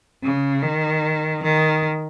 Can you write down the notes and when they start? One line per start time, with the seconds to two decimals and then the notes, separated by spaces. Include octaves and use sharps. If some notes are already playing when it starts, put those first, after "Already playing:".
0.23 C#3
0.63 D#3
1.43 D#3